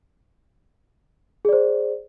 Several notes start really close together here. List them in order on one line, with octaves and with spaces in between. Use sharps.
G#4 D5 C5